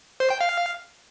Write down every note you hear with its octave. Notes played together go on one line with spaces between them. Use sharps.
C5
G5
F5